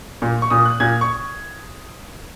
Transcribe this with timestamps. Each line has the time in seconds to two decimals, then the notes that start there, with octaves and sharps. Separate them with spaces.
0.22 A#2
0.42 C#6
0.50 A#2 D#6
0.65 F#6
0.80 A#2 G#6
1.01 C#6